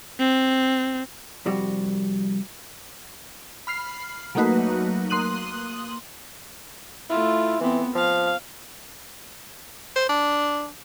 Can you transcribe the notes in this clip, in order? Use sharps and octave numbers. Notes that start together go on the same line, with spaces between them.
C4
C2 F2 G3 F#4
B5 F6 C7
F#3 A3 A#3 D#4 F#4 B4
A#3 C6 D#6 F#6 D#7 F#7
A3 E4 F4
E3 B3 C4
F3 F5
C5
D4